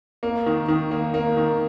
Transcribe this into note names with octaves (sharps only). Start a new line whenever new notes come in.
A#3
D#3
D#3
A#3
A#3
D#3